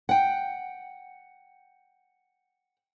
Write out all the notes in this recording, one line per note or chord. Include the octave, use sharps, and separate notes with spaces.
F#5 G5